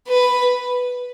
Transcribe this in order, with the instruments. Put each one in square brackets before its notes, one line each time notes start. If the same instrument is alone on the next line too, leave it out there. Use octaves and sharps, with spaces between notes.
[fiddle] B4